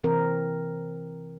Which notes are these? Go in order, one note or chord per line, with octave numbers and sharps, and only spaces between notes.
C3 E3 C4 A#4